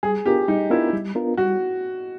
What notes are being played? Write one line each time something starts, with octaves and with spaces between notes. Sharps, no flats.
G3 G#4
B3 D4 F4 G4 A#4
G3 D#4
B3 D4 E4 F4 A#4
G3
B3 D4 F4 A#4
G3 F#4